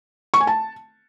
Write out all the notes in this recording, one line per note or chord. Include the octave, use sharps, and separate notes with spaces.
C#6
G#5
A5